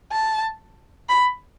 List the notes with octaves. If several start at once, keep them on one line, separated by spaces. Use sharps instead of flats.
A5
B5